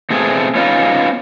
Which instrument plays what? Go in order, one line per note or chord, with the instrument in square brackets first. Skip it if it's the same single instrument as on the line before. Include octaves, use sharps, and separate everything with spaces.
[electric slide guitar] B2 A3 C4 G#4
B3 C#4 D#4 F4